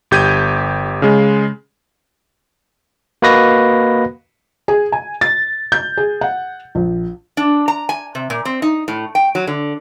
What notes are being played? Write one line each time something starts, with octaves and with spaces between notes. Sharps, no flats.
G1 G4 G6 G#6 D#7
C#3 G#3
A#3 F#4 B4 D#5 A#6
G#4
G#5
A6
G6
G#4
F#5
A#1
D4
A#5
G#5
C3
A#2
C4
D#4
A2
G5
F#3
D3